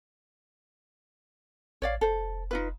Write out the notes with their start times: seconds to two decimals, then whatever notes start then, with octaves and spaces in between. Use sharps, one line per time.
1.82 A1 C#5 D5 F5
2.01 F1 A4 C5
2.51 D#4 F4 B4